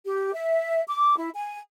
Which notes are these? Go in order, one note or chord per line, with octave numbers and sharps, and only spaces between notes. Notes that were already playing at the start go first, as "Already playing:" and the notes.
G4
E5
D6
E4
G#5